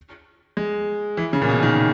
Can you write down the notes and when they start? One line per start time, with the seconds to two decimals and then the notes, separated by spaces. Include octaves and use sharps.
0.57 G#3
1.17 E3
1.33 C#3
1.42 A#2
1.49 B2
1.63 D#3